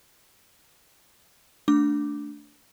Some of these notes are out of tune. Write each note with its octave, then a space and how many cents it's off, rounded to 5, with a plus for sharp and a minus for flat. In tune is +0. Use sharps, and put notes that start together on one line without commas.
A3 +0 D4 -10 D6 +0